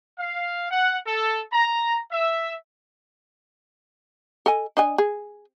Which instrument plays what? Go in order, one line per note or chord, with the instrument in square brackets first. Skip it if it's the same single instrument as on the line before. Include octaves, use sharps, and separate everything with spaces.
[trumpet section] F5
F#5
A4
A#5
E5
[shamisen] A4 D#5 G#5
D4 D#5 G#5
G#4